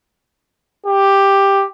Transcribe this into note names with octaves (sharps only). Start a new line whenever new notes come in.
G4